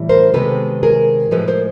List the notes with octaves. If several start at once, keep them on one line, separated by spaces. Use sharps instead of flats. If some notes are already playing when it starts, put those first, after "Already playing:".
Already playing: A2 E3 G3
A#4 C5
C3 D#3 G#3 B3 A4 B4
G#4 A#4
A2 F3 G#3 A4 B4
A#4 C5